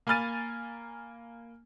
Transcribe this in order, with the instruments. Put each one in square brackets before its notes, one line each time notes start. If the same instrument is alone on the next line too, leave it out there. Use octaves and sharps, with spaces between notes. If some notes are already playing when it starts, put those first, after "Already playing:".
[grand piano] A#3 G#5 B5 F6 A6 D#7